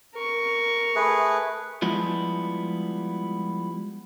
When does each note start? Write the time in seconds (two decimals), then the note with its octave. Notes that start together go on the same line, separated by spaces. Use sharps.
0.14 A#4 C#6
0.96 A3 G#4 B4
1.82 F3 G3 G#3 B3 E4 F4